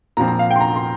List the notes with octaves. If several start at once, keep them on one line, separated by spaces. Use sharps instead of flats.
A#2 F3 C4 A#5
A#5
F5
G5
C6
A#5
C6